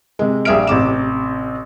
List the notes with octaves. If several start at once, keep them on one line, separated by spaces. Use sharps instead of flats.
C3 G#3
A#1 G3 G#4 E5 F6 D7
A1 C3 D6 E7